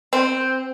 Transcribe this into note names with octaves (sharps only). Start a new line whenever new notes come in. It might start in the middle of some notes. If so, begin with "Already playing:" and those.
C4